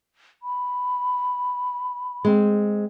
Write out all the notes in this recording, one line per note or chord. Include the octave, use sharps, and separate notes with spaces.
B5
G#3 C4